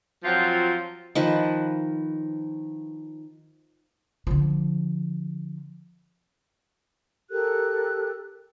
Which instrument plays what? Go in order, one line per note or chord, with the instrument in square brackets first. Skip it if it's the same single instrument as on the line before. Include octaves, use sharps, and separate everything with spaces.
[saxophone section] F3 F#3 C4 F4
[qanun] D#3 F3 B4
[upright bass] D3 F3
[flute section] G4 A4 A#4 F#6